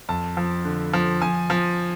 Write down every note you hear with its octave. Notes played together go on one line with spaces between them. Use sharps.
F2 A5
F3
D3
F3
F3 G#5
F3